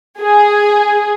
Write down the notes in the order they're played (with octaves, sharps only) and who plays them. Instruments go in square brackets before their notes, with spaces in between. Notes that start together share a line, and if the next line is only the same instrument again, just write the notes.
[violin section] G#4